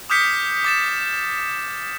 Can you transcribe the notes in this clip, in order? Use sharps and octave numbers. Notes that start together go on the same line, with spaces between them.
D6 D#6 F6 G6 B6 C#7
D6 A6 E7